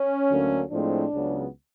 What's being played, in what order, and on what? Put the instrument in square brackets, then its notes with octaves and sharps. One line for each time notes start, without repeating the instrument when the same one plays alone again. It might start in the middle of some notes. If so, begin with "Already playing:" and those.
Already playing: [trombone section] C#4
D2 D3 F#3 A#3
A2 F3 G#3 C4 D4
C#2 C#3 F#3 B3